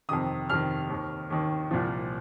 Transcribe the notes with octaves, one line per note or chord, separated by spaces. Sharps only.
F2 C3 D#3 D#6
F2 C3 D#3 F6
D#2 D#3
D#2 D#3
C2 A#2 F3